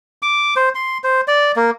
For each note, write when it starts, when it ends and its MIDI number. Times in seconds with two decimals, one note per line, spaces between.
0.23 0.54 86
0.56 0.69 72
0.75 0.98 84
1.04 1.21 72
1.28 1.52 74
1.56 1.70 58